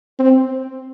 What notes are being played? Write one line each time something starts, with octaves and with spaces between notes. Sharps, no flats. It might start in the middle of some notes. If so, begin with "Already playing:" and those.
C4